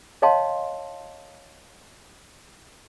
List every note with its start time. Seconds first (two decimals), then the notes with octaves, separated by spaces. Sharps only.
0.22 C#5 D#5 F5 G5 A5 C6